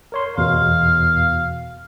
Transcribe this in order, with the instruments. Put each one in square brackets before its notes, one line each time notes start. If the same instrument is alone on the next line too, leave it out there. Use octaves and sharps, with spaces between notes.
[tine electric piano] A#4 C#5 C6
[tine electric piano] E2 B2 [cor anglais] F5